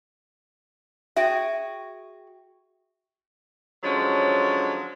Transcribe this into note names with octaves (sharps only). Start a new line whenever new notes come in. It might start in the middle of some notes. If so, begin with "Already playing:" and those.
F#4 G#4 E5 G5
D3 F3 F#3 G#3 C#4